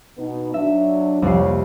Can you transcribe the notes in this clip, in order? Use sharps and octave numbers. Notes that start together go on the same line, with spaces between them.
B2 B3 D#4
F#3 D4 E5
C2 F2 A#3 G4 C#5 C7